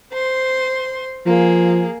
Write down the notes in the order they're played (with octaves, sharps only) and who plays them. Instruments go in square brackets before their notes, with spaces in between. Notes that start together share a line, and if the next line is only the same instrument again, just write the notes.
[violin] C5 C6
[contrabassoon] F3 [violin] A#3 G#4